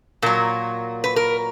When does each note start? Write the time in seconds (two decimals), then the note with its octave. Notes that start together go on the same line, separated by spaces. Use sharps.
0.22 A#2 F#3 A#4
1.04 B4
1.16 A#4